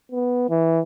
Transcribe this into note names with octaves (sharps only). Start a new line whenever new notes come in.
B3
E3